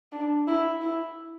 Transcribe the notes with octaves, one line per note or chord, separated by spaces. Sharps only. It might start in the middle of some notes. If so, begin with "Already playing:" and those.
D4
E4
E4